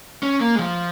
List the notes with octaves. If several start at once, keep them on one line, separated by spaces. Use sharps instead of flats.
C#4
A#3
G#3
F3